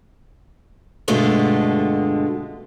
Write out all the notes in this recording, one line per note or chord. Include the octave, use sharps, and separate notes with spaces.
G2 B2 D3 G#3 A3 F4